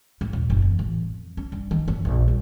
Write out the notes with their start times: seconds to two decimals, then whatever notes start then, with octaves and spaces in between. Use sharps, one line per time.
0.21 G#2
0.33 D#1
0.50 F#1
0.62 E2
0.79 A1
1.02 F2
1.37 C#4
1.52 G2
1.71 D#3
1.88 G#1
2.05 A#1
2.28 G3